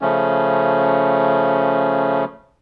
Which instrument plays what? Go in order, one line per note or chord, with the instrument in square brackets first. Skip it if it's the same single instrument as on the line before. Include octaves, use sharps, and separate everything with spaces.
[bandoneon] C#3 F3 A3 C#4